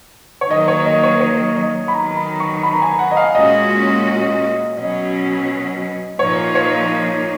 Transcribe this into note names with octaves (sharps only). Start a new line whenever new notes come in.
C#5
D#3 F#3 A#3 D#5
C#5
D#5
C#5
C#5
D#5
B5
D#3 F#3 B3 D#4 A#5
B5
C#6
B5
A#5
G#5
F#5
D#5
F5
A#2 G#3 C#4 F#4 D#5
B2 F#3 C#4 D#5
A#2 F3 A#3 D#4 C#5
C#5